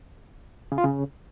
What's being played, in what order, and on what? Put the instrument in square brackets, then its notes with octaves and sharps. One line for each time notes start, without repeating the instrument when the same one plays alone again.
[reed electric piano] C#3
F4
C#3